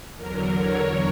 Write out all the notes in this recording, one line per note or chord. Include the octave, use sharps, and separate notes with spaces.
E2 D3 F#3 A#4
C#5